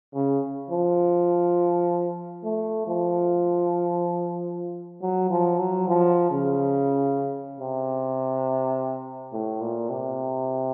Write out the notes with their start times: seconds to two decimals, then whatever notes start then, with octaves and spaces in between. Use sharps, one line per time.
0.14 C#3
0.71 F3
2.44 A3
2.87 F3
5.02 F#3
5.30 F3
5.59 F#3
5.88 F3
6.31 C#3
7.60 C3
9.33 A2
9.61 A#2
9.90 C3